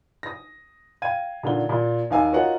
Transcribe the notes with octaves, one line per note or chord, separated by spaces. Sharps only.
D#6 A#6
F5 G5 G#6 D#7
A#2 D3 D#3 G7
A#2
D#2 D#4 F5 G#5 A#5 E6
F4 F#4 A#4 C#5 D#5 F#5